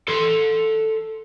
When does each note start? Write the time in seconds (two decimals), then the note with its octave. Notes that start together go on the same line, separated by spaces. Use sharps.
0.08 A4 C6